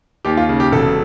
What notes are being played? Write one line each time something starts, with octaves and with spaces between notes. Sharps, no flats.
D#2 G4
F4
C#3
G4
E1 A4